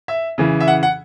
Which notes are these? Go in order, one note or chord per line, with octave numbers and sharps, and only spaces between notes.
E5
C#3 E3
E5
F#5
F#5